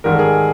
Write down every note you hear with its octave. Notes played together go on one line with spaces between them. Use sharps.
G#2 D#3 G3 A#4
A4
G#4 A#4